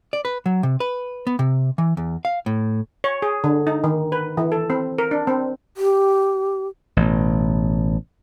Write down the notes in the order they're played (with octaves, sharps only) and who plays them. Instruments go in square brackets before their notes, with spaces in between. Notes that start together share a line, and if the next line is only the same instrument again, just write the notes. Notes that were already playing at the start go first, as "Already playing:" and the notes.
[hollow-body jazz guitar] D5
B4
F#3
C3
B4
B3
C3
E3
E2
F5
A2
[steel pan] C#5
G#4
D3
D#4
D#3
B4
E3
A4
C4
A#4
D4
C4
[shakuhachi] G4
[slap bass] A1 B2